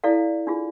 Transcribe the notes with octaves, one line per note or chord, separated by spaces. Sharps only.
E4 A4 D5 F5
D4 F4 G#4